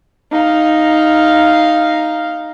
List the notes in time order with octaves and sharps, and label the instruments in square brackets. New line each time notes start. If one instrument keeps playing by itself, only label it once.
[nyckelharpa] D#4 F5